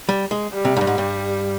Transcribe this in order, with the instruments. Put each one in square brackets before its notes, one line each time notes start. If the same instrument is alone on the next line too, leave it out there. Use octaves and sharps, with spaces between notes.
[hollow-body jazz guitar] G3
G#3
[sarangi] G3
[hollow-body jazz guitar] C3
G#2
G2
G#2
G2